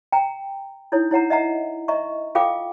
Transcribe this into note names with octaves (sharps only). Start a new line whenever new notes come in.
G5 A#5
D#4 E4 A4 C#5
E4 C#5 F#5 A#5
D#5 E5 F#5 A#5
D#5 E5 A#5 C#6
F4 A4 F5 G5 D6